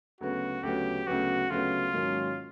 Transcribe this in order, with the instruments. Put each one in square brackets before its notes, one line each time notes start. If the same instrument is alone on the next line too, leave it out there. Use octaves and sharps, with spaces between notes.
[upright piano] D2 C#3 F#3 B3 [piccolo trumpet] F#4
[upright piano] D2 C#3 F#3 B3 [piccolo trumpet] G4
[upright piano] D2 C#3 F#3 B3 [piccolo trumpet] F#4
[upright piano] D2 C#3 F#3 B3 [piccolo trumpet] F4
[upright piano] G#2 D#3 F#3 A#3 C#4